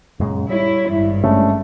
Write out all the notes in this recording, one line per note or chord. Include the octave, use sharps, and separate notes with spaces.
F#2 A#2 C#3 G#3
G3 E4 C#5
G#1 G2 E4
G#3 A3 C#4 D4